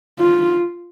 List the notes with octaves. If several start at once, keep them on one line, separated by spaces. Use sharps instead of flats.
F4